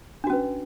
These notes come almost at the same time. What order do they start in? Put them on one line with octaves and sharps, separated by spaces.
D4 F#4 C#4 B4